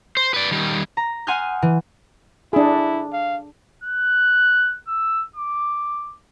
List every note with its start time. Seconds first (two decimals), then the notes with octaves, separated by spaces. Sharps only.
0.17 C5
0.34 B4 D5
0.51 D#3 G3
0.97 A#5
1.27 F#5 G#5 C6 D#6 F6 G6
1.62 E3
2.53 D4 E4 G#4
3.13 F5
3.84 F#6
4.88 E6
5.36 D6